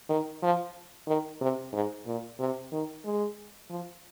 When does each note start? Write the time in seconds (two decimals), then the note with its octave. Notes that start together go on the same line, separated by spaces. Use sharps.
0.09 D#3
0.42 F3
1.07 D#3
1.41 C3
1.73 G#2
2.07 A#2
2.39 C3
2.72 D#3
3.05 G#3
3.70 F3